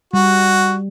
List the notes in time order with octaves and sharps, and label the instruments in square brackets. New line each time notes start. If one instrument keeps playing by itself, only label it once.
[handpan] G3 [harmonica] F#4